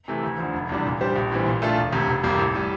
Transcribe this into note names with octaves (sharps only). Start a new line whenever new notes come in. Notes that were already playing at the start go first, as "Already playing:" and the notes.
C3 E3 A3
D2
D3 F3
F1
E2 C3 G3 D4
A#2
G3 D4 G4 C5
A#1
A2 E3 G3 C4
A#2
A3 D4 F4 A4
E1
D2 C3
F1
F2 C3 G3 A#3
A1
A2 G3